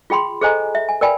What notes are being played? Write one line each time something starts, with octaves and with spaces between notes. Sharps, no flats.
F4 G#4 G5 B5 C6
G#4 A4 C5 D#5 G#5 A#5
E5
G#5
A#4 B4 D5 G5 G#5 B5